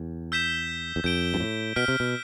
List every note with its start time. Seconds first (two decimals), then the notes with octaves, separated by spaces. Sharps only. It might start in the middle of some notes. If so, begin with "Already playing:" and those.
Already playing: E2
0.32 E6 G6 B6 E7 G7
0.96 E2
1.04 F2 G6 D7 G7
1.34 G2
1.40 A2
1.76 B2 F6 B6 D7 G7
1.88 C3
2.00 B2